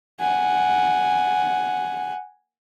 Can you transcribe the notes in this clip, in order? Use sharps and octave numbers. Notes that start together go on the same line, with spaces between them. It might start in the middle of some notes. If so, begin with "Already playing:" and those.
F#5 G#5